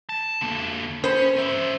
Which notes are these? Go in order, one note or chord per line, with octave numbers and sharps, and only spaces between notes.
A5
D3 A#3
C#4 C5 B5
C#4 E5